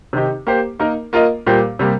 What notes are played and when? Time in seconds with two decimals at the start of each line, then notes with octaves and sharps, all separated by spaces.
0.13 C3 D#3 C4 D#4 G4
0.47 A#3 G4 C5
0.79 A#3 D#4 A#4
1.13 A#3 F4 A#4 D#5
1.47 A#2 G3 A#3 G4 C5
1.79 C3 G3 A#3 G4